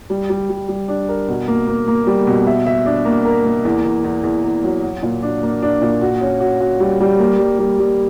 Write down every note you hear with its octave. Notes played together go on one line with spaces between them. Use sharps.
G3
G3
G3
G3
D4
A#4
B2
A#3
A#3
A#3
G3
B2
E5
E5
D4
A#3
A#4
A#3
E2
E2
E2
E2
E2
F#3
F#4
A#2
D4
A#3
D4
A#2
F#4
C#4
F#4
F#4
G3
G3
A#3
G3
G3
G3